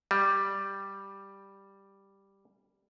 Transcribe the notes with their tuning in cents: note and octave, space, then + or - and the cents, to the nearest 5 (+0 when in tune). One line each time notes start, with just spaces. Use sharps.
G3 +0